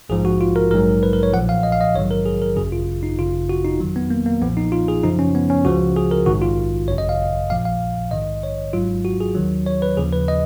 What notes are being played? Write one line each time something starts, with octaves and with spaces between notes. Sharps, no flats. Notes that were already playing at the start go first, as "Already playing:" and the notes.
A#1 G#2 F3 G#4
F#4
F4
A#4
A#1 G#2 F#3 A#4
B4
A#4
C#5
B1 A#2 F3 F#5
F5
D#5
F5
D#5
A#1 G#2 D#3 F#3 C#5
A#4
G#4
A#4
G#1 F#2 C#3 G#4
F4
D#4
G#1 F#2 C#3 F4
F#4
D#4
F2 D#3 F#3
B3
A#3
A#3
B1 A#2 F3 B3
D#4
F4
G#4
F#2 C#3 F3 D#4
C#4
B3
C#4
C#2 C#3 F3 F#4
G#4
A#4
A#1 G#2 D#3 F#4
F4
G#1 F#2 C#3 C#5
D#5
F5
A#1 A#2 F3 F5
F5
A#1 G#2 D#3 D#5
C#5
G#1 G#2 F#3 F4
F#4
G#4
D#2 D#3 F#3
C#5
B4
D#2 C#3 F3 G#4
B4
D#5